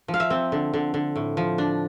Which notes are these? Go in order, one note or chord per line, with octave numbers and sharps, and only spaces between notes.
F3
F5
E5
C4
D3
D3
D3
A2
F3
D4